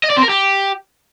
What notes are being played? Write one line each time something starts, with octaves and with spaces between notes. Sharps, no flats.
D#5
D5
C4
A#4
G4